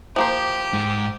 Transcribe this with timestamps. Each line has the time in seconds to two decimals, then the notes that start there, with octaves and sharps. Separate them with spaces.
0.16 F3 A#3 G4 C5
0.73 G#2